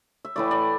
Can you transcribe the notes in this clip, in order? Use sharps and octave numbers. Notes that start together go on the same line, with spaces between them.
E5
A2 E3 A3 D5
D5